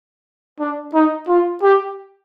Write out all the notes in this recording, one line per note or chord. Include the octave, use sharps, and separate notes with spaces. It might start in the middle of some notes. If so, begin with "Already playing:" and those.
D4
D#4
F4
G4